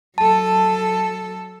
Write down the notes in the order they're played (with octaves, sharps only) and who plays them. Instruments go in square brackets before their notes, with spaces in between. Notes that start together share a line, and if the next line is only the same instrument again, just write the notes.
[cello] F#3 A4 [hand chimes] A5